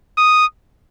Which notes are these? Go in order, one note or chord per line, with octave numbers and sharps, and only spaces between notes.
D#6